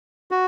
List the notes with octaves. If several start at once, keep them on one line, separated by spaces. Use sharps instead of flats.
F#4